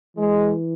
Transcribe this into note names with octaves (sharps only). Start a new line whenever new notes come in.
E3 G#3